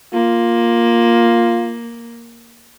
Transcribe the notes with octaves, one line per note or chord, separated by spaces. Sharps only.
A#3 F4